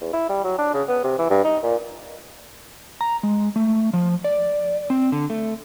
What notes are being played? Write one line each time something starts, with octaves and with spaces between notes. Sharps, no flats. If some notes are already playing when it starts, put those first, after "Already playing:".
E2
E4
G3
F#3
D4
C#3
B3
C3
E3
G2
D#4
A#2
A#5
G#3
A3
F3
D5
C4
D3
A3